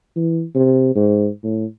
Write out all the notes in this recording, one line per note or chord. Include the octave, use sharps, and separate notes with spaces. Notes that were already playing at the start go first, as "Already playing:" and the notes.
E3
C3
G#2
A2